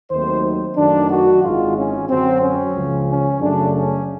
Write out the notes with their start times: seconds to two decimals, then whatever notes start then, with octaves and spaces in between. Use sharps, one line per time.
0.11 D#2 D#3 F#3 A3 C4 C5
0.77 F#2 D#3 F#3 A3 D4
1.10 F#4
1.43 G#1 G#2 E3 G#3 F4
1.76 C#4
2.09 F#2 D3 F#3 C4
2.43 C#4
2.75 C#2 C#3 F3
3.08 C#4
3.41 F#2 C#3 F#3 A3 D4
3.74 C#4